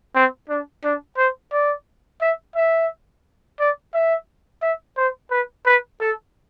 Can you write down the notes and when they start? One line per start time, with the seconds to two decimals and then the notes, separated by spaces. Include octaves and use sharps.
0.15 C4
0.49 D4
0.84 D4
1.18 C5
1.52 D5
2.21 E5
2.56 E5
3.60 D5
3.94 E5
4.62 E5
4.97 C5
5.31 B4
5.66 B4
6.01 A4